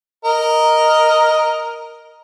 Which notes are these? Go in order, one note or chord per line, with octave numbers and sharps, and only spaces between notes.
A#4 D#5